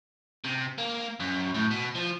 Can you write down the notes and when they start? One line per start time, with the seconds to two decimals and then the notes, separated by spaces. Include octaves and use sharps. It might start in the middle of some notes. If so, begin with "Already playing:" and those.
0.44 C3
0.78 A#3
1.20 F#2
1.54 A2
1.71 B2
1.95 F3